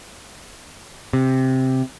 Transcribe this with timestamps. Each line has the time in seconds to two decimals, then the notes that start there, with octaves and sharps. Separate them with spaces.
1.13 C3